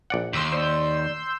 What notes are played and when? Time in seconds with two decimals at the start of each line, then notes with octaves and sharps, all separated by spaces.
0.10 A#1 D5 F#5
0.33 D#2 C6 E6 G6
0.52 C5 D5